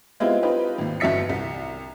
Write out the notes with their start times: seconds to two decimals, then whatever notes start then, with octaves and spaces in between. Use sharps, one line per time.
0.20 G#3 B3 C4 E4 F4 G4
0.43 C4 D#4 F4 G4 B4
0.78 G#1 D#2
1.00 G1 E2 F#4 E5 B6 C#7
1.29 C2